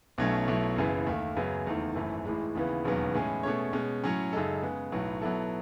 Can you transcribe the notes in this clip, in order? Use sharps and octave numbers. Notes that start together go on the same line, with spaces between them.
B1 B2 F#3 A3 C#4
B1 B2 F#3 A3 E4
F#1 F#2 C#3 E3 B3
D#2 D#3 A3
F#2 C#3 F#3 B3
F#1 E2 D#3 A3
G#1 F#2 E3 A3
A1 A2 E3 G#3
D#2 C#3 E3 B3
E1 D#2 C#3 F#3 B3
A2 E3 G#3 C#4 G#4
B2 A3 C#4 G#4 C#5
B2 G#3 C#4
A2 F#3 C#4
F#2 C#3 G#3 D#4 A4
C#3 G#3 B3
B1 A2 F#3 B3
B2 F#3 B3 E4 A4